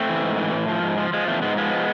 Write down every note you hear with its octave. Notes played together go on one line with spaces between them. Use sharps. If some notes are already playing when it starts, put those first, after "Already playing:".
Already playing: A3 C4
E3
G#2
E3
A2
F3
G#2
F3
F3 G#3
E2 A3
G#2 G#3 B3
F3 G#3 B3